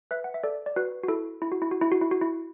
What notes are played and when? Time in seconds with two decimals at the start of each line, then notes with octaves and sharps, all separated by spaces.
0.11 B4 E5
0.24 F#5
0.34 E5
0.43 A4 D5
0.66 D5
0.76 F#4 B4
1.04 F#4
1.08 E4 A4
1.42 E4
1.52 F#4
1.62 E4
1.71 F#4
1.81 E4
1.92 F#4
2.02 E4
2.11 F#4
2.21 E4